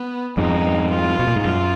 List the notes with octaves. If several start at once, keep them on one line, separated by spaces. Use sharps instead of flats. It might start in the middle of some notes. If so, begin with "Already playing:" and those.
Already playing: B3
F2 G#2 D#4
F4
B2
A#2
G#2
F#2 F4